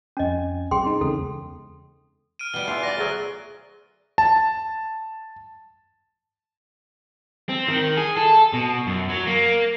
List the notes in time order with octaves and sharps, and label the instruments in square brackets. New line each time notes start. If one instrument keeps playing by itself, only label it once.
[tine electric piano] F2 G#5 [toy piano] C#4 D#5
[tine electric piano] B1 [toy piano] G#4 G5 C6
[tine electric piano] C4 D#4
[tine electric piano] E2 C#3 G#3 [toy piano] A4
[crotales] F6 D7 D#7
[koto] B2 G3 [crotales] G7
[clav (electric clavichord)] E2 E3 [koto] F4
[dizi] D5 [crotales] A#6
[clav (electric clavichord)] D2 F#3 [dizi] G#4
[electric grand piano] A5
[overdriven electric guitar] C4
D#3
G#4
A4
B2
F#2
F#3
A#3